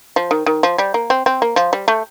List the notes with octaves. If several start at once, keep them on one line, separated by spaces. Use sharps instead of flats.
F3
D#3
D#3
F3
G3
A#3
C4
C4
A#3
F3
G3
A3